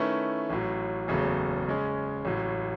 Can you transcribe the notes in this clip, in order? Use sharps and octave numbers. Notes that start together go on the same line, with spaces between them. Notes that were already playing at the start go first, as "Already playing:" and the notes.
Already playing: D#3 A3 C#4 E4 B4
A1 A2 F#3
F#1 E2 C#3 F#3 A3
C#3 G#3 C#4
A1 A2 F#3